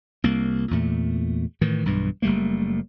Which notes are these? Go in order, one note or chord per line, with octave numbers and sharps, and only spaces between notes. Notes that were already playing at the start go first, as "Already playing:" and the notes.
C2 A#3
E2 A#2 A3
A2 D#3 E3
B1 G2 E3
F#1 G3 A3 A#3